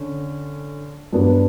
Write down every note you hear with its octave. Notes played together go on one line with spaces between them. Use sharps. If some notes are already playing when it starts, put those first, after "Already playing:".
Already playing: D3 C#4
G2 F#3 B3 D4